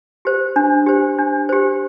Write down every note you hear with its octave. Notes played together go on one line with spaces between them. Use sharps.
G4 C5
D4
G4 C5
D4
G4 C5